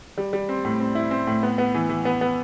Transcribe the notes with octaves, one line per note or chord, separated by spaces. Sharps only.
G3
G3
C4
A2
C4
E4
C4
A2
B3
B3
E3
E3
B3
B3